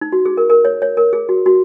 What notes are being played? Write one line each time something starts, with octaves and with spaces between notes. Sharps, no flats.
D#4
F#4
G#4
A#4
A#4
C#5
C#5
A#4
G#4
F#4
F#4